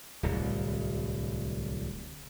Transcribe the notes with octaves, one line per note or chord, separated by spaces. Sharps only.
D1 C2